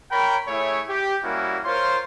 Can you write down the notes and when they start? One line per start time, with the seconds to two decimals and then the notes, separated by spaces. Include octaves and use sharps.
0.11 A#4 C#5 G5 A#5 B5
0.48 A3 E4 G#4 C#5
0.88 G4
1.23 G3 A#3 C#4 E4 F#4
1.65 F4 A#4 C5 C#5 C6